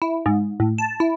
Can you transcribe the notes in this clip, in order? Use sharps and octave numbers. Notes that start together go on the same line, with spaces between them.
E4
G#2
A2
A5
E4